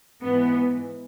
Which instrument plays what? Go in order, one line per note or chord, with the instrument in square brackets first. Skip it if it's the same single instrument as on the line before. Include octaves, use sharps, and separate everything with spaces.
[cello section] G#2 E3 B3